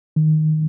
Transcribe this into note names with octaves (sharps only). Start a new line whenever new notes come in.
D#3